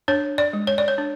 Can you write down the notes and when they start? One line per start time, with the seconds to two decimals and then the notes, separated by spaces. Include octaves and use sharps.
0.08 D4 C#5
0.38 D5
0.53 G#3
0.67 C#5
0.78 D5
0.88 C#5
0.98 D4